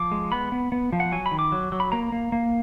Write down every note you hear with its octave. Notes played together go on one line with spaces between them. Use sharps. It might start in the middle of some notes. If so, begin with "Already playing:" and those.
Already playing: F3 D6
G#3
B3 B5
B3
B3
F3
F#5
F#3 G#5
B5
D#3
D6
F#3
F#3
B5
A#3 A#5
A#3
A#3